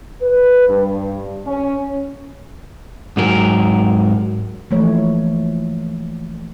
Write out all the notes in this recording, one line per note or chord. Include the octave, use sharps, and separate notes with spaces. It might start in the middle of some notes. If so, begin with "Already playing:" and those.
B4
G2
C#4
G#2 F#3 A#4
E3 F3 A3 A#3 C#5